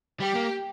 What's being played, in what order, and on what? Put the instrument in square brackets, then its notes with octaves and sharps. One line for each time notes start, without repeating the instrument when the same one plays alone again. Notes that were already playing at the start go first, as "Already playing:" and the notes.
[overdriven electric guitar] G3 [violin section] G4
[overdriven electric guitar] A#3